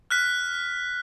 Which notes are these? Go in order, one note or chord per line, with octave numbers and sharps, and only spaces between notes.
F6 F#6 B6